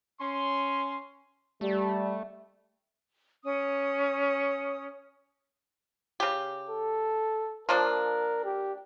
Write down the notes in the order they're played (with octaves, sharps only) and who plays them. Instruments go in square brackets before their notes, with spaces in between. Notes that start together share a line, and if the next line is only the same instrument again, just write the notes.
[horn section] C#4 C6
[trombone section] G3 [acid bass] A3
[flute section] C#4 D#6
[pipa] C#3 G4
[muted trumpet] A4
[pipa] F3 A#3 D4 [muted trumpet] A#4
[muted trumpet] G4